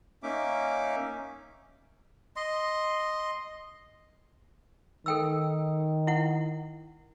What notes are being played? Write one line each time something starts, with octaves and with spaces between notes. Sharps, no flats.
A#3 C#4 D#4 E5 D6
D#5 C6
D#3 A4 G5 E6
E4 F#5